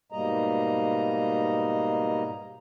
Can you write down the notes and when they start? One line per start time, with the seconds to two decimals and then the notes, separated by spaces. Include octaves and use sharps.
0.12 G#2 B2 G3 A#3 D#5 A#5